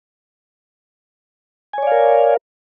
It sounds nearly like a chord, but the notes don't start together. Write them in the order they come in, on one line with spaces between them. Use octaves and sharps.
G#5 C#5 D5 F5 A#4